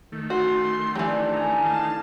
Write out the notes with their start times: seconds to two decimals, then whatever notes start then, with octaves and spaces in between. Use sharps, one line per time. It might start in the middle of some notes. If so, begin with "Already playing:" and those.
0.12 D#3 A3
0.30 F#2 F#4 C6
0.95 E3 F#3 C4 D4 E4 G4
1.32 A2 G#4 G#5 A#5
1.63 D#4 F5 A5